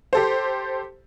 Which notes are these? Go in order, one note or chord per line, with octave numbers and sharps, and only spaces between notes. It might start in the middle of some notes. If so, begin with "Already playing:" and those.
G4 A4 C5